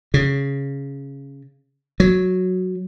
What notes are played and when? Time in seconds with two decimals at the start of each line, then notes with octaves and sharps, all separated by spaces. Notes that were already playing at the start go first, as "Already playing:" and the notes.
0.14 C#3
2.00 F#3